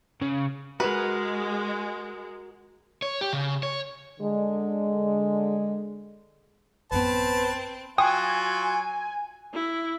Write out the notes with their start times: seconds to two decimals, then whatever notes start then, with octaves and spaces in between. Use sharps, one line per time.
0.22 C#3
0.80 G#3 F#4 A#4 B4
3.02 C#5
3.21 G4
3.33 C#3
3.63 C#5
4.21 D3 G#3
6.92 A1 F#2 B3 C4 B4 A5
7.98 F#3 F4 F#4 G5 G#5 D#6
9.54 E4